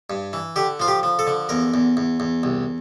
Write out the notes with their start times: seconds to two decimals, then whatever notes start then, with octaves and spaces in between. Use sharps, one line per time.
0.10 G2
0.33 E3
0.56 D3 G4
0.80 F3 F4
0.88 G4
1.03 F3
1.19 A4
1.27 D3
1.49 E2 A#4
1.74 E2
1.97 E2
2.20 E2
2.43 C2